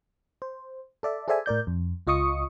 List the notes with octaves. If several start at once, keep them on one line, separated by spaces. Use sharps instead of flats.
C5
A4 D5 E5
G#4 A4 C5 D5 E5 G#5
A2 A#4 D5 G6
F2
C#2 F4 D#5 C#6 D#6 C#7